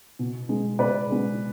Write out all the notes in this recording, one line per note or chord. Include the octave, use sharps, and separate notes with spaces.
B2
G#3 B3
B2 B4 D5
G#3 B3